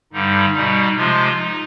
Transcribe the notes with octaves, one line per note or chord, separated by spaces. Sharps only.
G2 D3 G3 D#4
B2 G3 D#4
C3 F3 G#3 F4
D#4